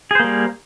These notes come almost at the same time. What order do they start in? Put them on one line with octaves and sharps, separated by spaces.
G#4 C5 A#3 G3